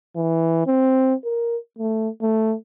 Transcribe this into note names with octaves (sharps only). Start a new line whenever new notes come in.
E3
C4
A#4
A3
A3